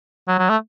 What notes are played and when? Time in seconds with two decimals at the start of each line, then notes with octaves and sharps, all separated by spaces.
0.28 F#3
0.38 F#3
0.49 A3